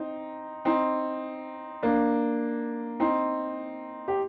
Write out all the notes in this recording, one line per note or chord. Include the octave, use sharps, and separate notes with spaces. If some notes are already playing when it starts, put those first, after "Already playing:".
Already playing: C4 D#4
C4 D#4
A#3 D4
C4 D#4
G4